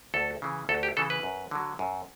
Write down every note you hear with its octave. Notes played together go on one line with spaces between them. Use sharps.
D2 A4
C#3 E3
D2 A4
G4
C#3 E3 A4
B4
F#2
D3 F#3
F#2